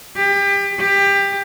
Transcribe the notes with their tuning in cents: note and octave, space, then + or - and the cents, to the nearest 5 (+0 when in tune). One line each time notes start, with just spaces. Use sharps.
G4 +30
G4 +20